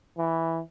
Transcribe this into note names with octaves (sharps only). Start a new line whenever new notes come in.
E3